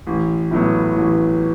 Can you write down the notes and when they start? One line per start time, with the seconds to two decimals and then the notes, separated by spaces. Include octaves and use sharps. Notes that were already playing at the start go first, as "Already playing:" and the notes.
0.07 A1
0.51 A2 F#3 B3
0.96 A1